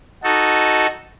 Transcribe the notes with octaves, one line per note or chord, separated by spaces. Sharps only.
D#4 F#4 A4